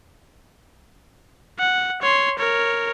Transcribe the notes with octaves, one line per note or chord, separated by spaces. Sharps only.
F#5
C#5 C6
A#4 C#5